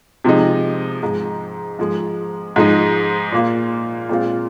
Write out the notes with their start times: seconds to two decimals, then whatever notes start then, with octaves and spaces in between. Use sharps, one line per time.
0.24 C3 F3 G#3 D#4
1.02 G#2 F3 G#3
1.79 G#2 F3 G#3
2.56 G#2 F3 G#3 D#4
3.32 A#2 A#3 F4
4.09 A#2 G#3 C4 F4